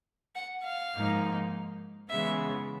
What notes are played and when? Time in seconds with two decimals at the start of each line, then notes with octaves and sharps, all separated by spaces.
0.35 F#5
0.64 F5
0.94 G#2 F3 A#3 D#4
2.10 C#3 E3 G#3 B3 E5